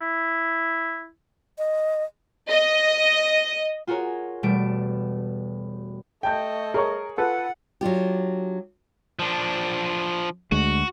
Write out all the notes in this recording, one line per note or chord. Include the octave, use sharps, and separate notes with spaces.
E4
D#5
D#5
F4 F#4 G#4 A#4 C#5
E1 B2 G3 A3 D7
A3 D#5 G5 A5 G6
G#4 A#4 C#5 C#6
F4 A4 B4 F#5
F#3 D4 F4 G4
F3 D4
D2 G#3 F#4